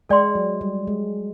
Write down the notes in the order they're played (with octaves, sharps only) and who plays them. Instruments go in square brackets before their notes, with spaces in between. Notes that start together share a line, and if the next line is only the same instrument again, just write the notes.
[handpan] G#3 [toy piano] A4 D5 G5 C6
[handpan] F#3
G3
G#3